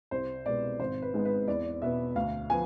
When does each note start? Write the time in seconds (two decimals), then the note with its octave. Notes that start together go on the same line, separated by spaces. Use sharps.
0.11 C2 C5
0.46 B2 G#3 B3 D5
0.79 G#1 C5
1.02 B4
1.14 G#2 G#3 B3
1.25 B4
1.48 E2 D5
1.82 B2 B3 E5
2.16 D2 F5
2.50 F3 B3 G#5